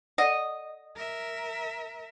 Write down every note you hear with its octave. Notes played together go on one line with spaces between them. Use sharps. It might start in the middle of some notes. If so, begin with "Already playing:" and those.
A4 D5 D#5 F#5
A#4 E5